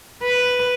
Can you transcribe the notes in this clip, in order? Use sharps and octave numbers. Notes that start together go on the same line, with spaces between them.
B4